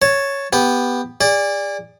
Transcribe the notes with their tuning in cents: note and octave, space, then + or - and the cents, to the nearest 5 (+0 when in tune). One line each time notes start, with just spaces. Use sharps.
C#5 +0 A5 +0
B3 +0 G4 +10
G#4 -35 D5 +0